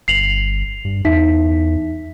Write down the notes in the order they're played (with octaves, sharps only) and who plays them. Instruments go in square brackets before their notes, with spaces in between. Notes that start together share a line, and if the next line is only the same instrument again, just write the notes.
[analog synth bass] G1 [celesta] C7 F7 F#7
[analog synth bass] G2
[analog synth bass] E2 [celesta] D#4 E5 B6